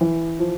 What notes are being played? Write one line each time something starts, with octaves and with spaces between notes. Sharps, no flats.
E3
F3